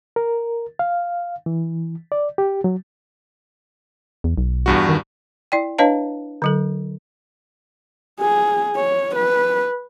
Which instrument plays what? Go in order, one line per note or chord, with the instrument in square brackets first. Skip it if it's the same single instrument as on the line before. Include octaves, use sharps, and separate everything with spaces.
[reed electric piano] A#4
F5
E3
D5
G4
F#3
[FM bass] E2
B1
[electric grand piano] E2 G2 F#4
[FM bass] D#3
[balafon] E4 D5 G5
D4 B4 C#5 D#5 F5 A5
D3 F#3 A4
[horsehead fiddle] G#4
C#5
B4